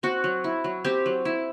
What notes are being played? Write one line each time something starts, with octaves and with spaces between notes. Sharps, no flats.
C4 F#4
F#3
E4
F#3
C4 G4
F#3
E4